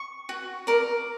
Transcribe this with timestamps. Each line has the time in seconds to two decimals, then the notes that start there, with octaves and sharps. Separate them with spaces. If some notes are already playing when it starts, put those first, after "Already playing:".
Already playing: C#6
0.29 F#4
0.67 A#4 D5